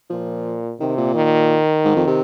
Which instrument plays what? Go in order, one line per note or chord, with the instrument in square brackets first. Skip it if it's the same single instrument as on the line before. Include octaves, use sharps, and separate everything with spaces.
[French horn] A#2 [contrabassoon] F3
[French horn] C3 [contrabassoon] D#3
[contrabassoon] A#2
[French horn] D#3
[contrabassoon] G#2
F2
C3